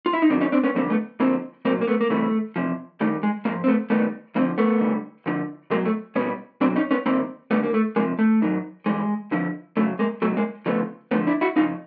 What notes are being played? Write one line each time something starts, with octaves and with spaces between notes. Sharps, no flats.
F4
E4
D#4
G#2 D#3 F#3 C4 D4
C#4 D#4
C4 D4
B3 C#4
F2 D3 G3 A#3 C4
A3 B3
F2 D3 F3 A#3 C4
C2 A#2 F#3 A#3 C4
A#3
A3 B3
A#3
C#2 C3 E3 G3 A3
E2 C3 F3
D#2 D#3 G3 A3
G#3
G#2 F3 G#3 A#3
C4
A3 B3
D#2 D#3 G3 A3 B3
F2 D3 F3 A#3 C4
A3 B3
D#2 D3 G3
D2 D3 F3
C2 B2 F#3 G#3 A#3
A3
B1 B2 G3 B3 C#4
B1 B2 F#3 C4 D4
C#4 D#4
B3 C#4
G#2 D#3 G3 A#3 C4
D#2 D3 G3 A3 B3
A#3
A3
C#2 C3 F3 G#3 A#3
A3
G#2 D#3 F#3
G2 E3 G3 G#3
F2 D3 F3
F#2 C#3 F#3 A3
G#3 A#3
C#2 B2 F#3 A3
G#3 A#3
D2 C#3 F3 A3 B3
G2 D3 F3 A3 B3
D4 E4
E4 F#4
F2 C#3 F3 D#4 F4